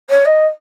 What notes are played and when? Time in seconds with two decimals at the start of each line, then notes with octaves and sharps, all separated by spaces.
0.09 C#5
0.25 D#5